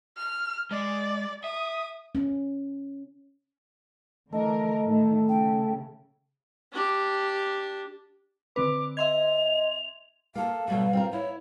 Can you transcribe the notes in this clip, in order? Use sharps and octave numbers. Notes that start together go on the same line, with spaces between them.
F6
G#3 D5
E5 D#6
C#4
D3 E3 A3 A#4 D#5
A2 D#3
C#3 G5
D4 G4
D3 C4 B4 D6
D#5 E5 C6 G#6 F7
A#3 A4 F5
B2 F#3 G3 A3
C4 F4 A#4
E4 C#5